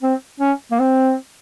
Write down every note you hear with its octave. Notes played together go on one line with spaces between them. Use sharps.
C4
C#4
A#3
C4